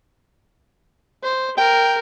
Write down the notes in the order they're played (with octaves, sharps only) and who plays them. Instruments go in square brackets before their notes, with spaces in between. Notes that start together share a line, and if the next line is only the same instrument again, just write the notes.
[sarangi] C5
[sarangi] A#4 [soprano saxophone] G5